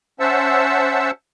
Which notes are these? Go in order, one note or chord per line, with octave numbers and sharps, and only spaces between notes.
C#4 C5 E5 F#5 A5 E6